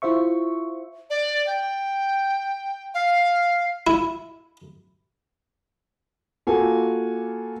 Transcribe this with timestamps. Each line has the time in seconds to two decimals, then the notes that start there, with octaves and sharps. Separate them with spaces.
0.02 E4 F4 C5 E5 C#6
1.10 D5
1.47 G5
2.94 F5
3.87 E4
6.47 A#3 F4 F#4 A4 G#5